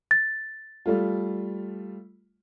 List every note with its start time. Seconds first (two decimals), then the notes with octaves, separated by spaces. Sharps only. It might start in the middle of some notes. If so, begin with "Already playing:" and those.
0.11 A6
0.86 G3 A3 F4